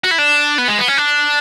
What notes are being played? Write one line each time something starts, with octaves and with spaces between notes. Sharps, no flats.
F#4
E4
D4
B3
G#3
B3
C#4
D4